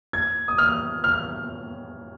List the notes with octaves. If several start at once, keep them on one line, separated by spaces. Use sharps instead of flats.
G#6
D#6
F6
F6